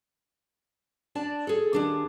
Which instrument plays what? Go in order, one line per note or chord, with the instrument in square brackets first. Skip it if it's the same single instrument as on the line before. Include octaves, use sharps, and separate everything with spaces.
[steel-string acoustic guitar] D4 D5 A5
G#4 A4
D#2 D4 G#4